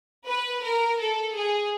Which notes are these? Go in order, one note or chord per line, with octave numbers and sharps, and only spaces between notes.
B4
A#4
A4
G#4